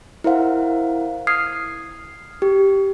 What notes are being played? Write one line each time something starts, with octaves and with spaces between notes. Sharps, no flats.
E4 A#4 C5 F5 F#5
D#6 F6 G#6 C7
G4